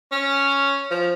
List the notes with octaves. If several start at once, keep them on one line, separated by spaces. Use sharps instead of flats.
C#4
F3